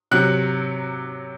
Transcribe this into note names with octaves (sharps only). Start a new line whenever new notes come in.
C3 F#3 F#6